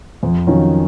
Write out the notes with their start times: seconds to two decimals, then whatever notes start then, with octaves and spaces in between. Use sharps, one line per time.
0.23 F2
0.47 D#3 F#3 C#4 F4